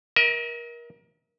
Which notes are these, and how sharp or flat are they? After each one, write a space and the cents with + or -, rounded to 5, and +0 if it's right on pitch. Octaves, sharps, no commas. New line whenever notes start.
A#4 +25 E5 -45